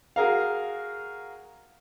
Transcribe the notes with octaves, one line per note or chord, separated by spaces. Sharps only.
F#4 G#4 A#4 F5